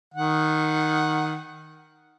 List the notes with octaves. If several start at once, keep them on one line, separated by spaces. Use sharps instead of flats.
D#3 F#5